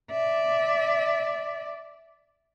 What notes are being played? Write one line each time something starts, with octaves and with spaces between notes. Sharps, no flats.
D5 E5